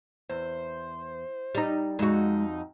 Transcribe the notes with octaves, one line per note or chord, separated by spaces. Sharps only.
E2 C5
G3 D#4
F2 G#3 D#4 F#4